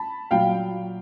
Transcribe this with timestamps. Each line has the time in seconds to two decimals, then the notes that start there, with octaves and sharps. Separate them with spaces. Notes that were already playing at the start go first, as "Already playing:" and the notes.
Already playing: A5 B5
0.31 A#2 F#3 F5 G5